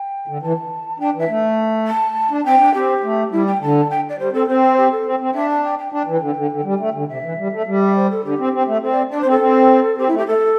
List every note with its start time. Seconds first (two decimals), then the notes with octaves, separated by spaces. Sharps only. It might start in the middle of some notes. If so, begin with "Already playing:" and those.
Already playing: G5
0.28 D3
0.42 E3 A5
1.00 D4 G5
1.15 E3 E5
1.29 A3
1.87 A5
2.31 D4
2.45 C4 G5
2.60 D4
2.74 C4 G4
3.03 A3
3.31 G3 E4
3.46 G5
3.61 D3 A5
3.90 G5
4.09 D5
4.19 G3 C5
4.33 C4 A4
4.48 C4 C5
4.62 C5
4.77 G4
4.91 A4
5.05 C4
5.20 C4
5.34 D4 E5
5.49 A5
5.64 G5
5.78 G5
5.92 D4 G5
6.07 E3
6.21 D3
6.37 D3
6.51 D3
6.64 G3
6.80 A3
6.94 D3
7.08 C3 E5
7.23 E3
7.38 G3
7.52 A3
7.67 G3
7.95 C5
8.10 A4
8.24 D3 G4
8.39 C4
8.53 C4
8.68 A3
8.82 C4 A4
8.92 D5
9.11 D4 D5
9.21 C4 C5
9.31 A4
9.40 C4
9.98 C4 G4
10.07 A3 E4
10.18 G4
10.27 A3 A4